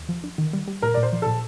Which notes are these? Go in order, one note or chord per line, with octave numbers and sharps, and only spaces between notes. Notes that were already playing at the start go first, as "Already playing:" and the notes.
Already playing: D#2
F3
D4
D#3
G3
G3
A#2 A#4
A#2 D5
C5
F3
A#2 A4